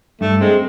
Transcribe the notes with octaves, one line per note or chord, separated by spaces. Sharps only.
G2 A3
G#3 C4